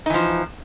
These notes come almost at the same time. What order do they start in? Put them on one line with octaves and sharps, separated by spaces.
D#4 E3 F3